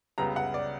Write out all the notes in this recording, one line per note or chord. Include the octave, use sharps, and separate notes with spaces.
C#2 C#3 G3 B3 A#5
F#5
D5